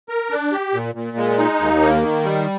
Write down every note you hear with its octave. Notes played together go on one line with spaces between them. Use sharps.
A#4
D4
G4
A#2
A#2
G#3
D#4
D#2
A#3
D#3
G3